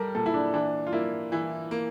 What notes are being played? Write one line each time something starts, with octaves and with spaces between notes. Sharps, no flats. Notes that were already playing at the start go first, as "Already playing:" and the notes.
Already playing: G3 G4 A4 A#4
A#2 A4
E4
D4
E3 D4
F4
A#3 E4
E3 E4
A#3